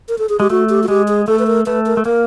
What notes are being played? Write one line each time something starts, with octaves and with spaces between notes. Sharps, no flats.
A#4
A4
G#4
G#3 G4
A3 F#4
G4
F#4
G#3 G4
G#4
A3 A4
B4
A#4
A3 B4
A#4
A3
A#3 A#4